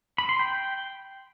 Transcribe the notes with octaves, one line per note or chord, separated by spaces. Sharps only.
B5
C6
G5